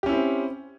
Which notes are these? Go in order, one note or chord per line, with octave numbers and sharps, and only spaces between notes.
C4 C#4 E4 G4